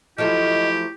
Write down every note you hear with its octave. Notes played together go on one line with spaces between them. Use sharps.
F3 F#3 A3 E4 G4 D#5